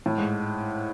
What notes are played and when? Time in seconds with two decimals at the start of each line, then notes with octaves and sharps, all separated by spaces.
0.06 A2
0.18 G#2